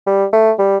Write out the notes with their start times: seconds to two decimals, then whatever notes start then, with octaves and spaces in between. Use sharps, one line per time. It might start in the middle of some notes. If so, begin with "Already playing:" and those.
0.07 G3
0.33 A3
0.58 G3